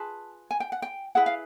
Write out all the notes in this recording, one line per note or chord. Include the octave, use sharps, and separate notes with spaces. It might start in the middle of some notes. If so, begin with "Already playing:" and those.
Already playing: F4 G#4 B4 A5
G#5
G5
F#5
G5
E4 G#4 B4 F#5
F5